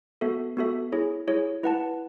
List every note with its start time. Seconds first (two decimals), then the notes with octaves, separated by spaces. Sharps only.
0.21 B3 F#4 A4 E5
0.57 B3 F#4 A4 E5
0.92 E4 G#4 C#5
1.28 E4 G#4 C#5
1.63 E4 B4 F#5 A5